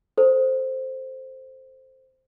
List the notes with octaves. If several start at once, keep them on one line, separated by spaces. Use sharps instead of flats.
A4 C5